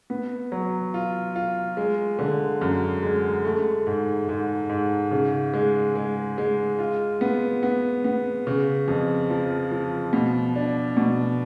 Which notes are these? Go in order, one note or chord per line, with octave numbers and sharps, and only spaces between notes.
B3
F#3
F4
F4
G#3
D3
F#2
G#3
A3
G#2
G#2
G#2
C#3
G#3
G#3
G#3
F4
B3
B3
B3
C#3
F2
F3
F3
B2
D4
B2